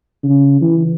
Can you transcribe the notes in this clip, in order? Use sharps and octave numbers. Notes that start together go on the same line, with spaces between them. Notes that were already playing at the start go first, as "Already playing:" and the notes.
C#3
E3